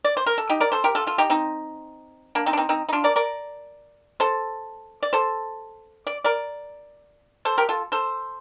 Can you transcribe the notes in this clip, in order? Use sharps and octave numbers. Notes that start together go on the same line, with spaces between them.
D5
C5
A#4
A4
D#4 G4
A#4 D5
A4 C5
G4 A#4
F4 A4
F4 A4
D#4 G4
C4 D#4
A#3 D4
C4 D#4
D4
C4 D#4
C4 D#4
D#4
D4 F4
A#4 D5
A#4 D5
A4 C5
D5
A4 C5
D5
A#4 D5
A4 C5
G4 A#4
F4 A4
A4 C5